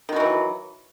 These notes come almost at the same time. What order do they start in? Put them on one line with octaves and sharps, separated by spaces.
D#3 F#4 E3 F#3